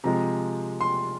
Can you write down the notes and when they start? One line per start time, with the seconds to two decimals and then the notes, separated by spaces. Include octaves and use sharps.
0.04 C3 F3 G#3 A#5
0.81 C6